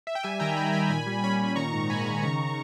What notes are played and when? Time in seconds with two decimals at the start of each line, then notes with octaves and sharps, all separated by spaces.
0.07 E5
0.15 G5
0.23 G3 E5 G#5
0.40 D#3 G5 A#5
0.56 G3 G#5 B5
0.73 D#3 G#5 B5
0.90 A#2 G#5 B5
1.07 G3
1.23 C#4 G#5 B5
1.39 A#2
1.56 D#3 A#5 C#6
1.73 G#2
1.89 G#2 G#5 B5
2.06 D#3
2.22 C#3 A#5 C#6
2.47 C#6